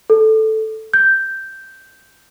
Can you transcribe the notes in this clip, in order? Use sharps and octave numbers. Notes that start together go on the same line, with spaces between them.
A4
G6